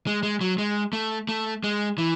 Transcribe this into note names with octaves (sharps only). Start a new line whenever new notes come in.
G#3
G#3
F#3
G#3
A3
A3
G#3
E3